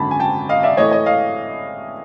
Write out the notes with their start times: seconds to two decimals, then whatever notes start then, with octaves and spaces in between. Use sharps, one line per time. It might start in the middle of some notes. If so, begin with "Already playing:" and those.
Already playing: G#1 F#2 D3 A5 B5
0.11 G#5
0.20 G5 A5
0.49 D#5 F5
0.63 D5 E5
0.77 A2 E3 A3 C#5 D#5
0.91 C#5 D#5
1.06 D#5 F5